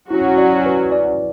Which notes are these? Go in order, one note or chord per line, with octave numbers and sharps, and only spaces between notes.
F#3 C#4 E4 F#4
D5
B4
D5